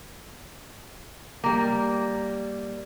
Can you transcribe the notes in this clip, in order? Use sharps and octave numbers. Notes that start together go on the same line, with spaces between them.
G3 A#3